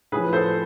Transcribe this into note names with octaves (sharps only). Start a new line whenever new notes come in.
A2 F3 G#4 B4
A4 C5